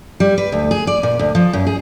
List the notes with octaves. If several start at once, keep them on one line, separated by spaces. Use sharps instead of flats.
G3
B4
D2
G#4
D5
A#2
D2
F3
F#2
G#4